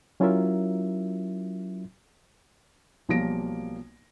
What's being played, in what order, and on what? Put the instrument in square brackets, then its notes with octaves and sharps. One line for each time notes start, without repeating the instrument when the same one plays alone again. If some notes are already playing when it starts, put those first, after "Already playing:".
[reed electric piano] F#3 C#4 E4 F4 A#4 E5
[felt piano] B1 F3 G3 A#3 A#6 D7